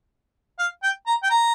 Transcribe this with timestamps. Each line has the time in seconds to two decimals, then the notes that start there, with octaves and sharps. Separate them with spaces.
0.59 F5
0.83 G5
1.07 A#5
1.23 G5
1.30 A#5